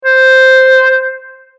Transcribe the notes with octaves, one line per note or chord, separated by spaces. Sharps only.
C5